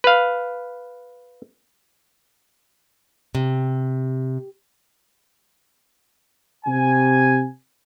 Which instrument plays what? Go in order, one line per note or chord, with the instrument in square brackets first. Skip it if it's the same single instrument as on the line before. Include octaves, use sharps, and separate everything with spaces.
[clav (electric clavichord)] B4 F5
[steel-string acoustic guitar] C3
[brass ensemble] C3 G#5